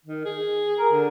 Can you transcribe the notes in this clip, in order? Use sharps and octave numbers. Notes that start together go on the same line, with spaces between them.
D#3
G#4
A#4
D3